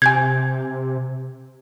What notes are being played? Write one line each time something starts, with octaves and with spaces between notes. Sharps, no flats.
C3 G#5 G6 G#6